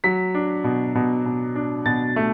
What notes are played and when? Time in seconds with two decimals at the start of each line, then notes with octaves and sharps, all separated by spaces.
0.04 F#3 B6
0.34 D4
0.64 B2
0.95 B2
1.25 B2
1.55 D4
1.86 B2 A6
2.16 A3